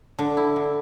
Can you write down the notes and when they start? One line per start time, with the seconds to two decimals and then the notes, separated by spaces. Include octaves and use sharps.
0.19 D3
0.37 E4
0.56 D3